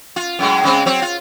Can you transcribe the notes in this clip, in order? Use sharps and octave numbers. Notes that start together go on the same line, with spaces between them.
F4
F#2 A2 G#3
C#3 G#3 C4
F#3 C4 C#5
F4